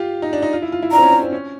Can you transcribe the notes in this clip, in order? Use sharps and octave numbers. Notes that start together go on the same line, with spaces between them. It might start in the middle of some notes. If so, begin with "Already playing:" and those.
Already playing: F4 G4
D#4
D4
D#4
F4
E4
F4
E4
D4 A#5
C4
C#4
C4
C4
C#4